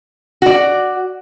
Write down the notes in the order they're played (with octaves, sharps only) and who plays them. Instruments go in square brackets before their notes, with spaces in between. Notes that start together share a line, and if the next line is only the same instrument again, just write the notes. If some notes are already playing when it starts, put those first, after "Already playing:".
[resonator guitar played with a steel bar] F#4 D5